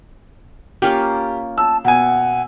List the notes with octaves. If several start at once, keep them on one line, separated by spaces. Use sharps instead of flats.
A#3 C#4 F4 G4
A5 E6
B2 F#5 G#5